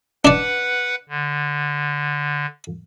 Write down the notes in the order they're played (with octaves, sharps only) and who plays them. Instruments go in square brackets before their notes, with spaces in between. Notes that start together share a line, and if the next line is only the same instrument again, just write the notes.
[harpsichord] D4 D5 [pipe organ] B4 F#5
[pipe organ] D3